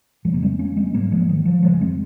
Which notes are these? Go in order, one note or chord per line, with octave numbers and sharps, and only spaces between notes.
F2 C#3 F3 F#3 G#3 A#3
G#3 C4
A#3 C#4
G#3 C4
G#2 F#3 A#3
F3 G#3
D#3
F3
F2 C#3 F3 G#3
G#3 C4